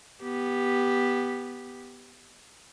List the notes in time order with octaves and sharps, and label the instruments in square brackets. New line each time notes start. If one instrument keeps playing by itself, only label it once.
[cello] B3 G4